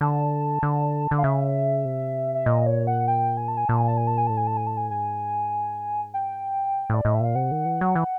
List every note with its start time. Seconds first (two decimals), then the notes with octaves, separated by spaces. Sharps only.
0.01 D3 A5
0.63 D3
1.11 D3
1.18 F5
1.24 C#3 E5
1.85 C3
2.35 E5
2.46 A#2 D#5
2.66 C#5
2.87 F#5
3.08 G5
3.37 G#5
3.48 A5
3.57 G#5
3.68 A#2 A5
3.77 G#5
3.88 A5
3.97 G#5
4.07 A5
4.18 G#5
4.27 A2 A5
4.37 G#5
4.47 A5
4.57 G#5
4.67 A5
4.77 G#5
4.90 G#2 G#5
6.14 G5
6.74 A2
6.90 A2 D5
7.05 A2 D#5
7.15 E5
7.20 A#2 F5
7.35 C3 F#5
7.51 D#3
7.66 E3
7.81 F#3
7.95 E3